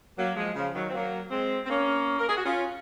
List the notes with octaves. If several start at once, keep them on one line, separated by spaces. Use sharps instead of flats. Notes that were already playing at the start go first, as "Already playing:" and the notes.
F#3 A#3
F3 G#3
C#3 F3
D#3 F#3
C4
F#3 A#3
G#3 C4
C4
A#3 C#4
A#4
G#4
F#4
C#4 F4